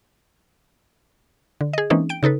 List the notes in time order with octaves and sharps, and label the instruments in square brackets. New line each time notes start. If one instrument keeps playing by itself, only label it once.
[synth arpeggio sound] D3
G#4 D#5
E3 G#3 A#3 C4 C#4 D#4
G5 D7
C#3 D#4 A4 B4